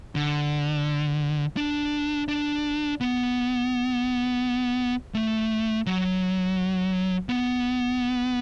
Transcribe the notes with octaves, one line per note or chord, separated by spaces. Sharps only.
D3
D4
D4
B3
A3
F#3
B3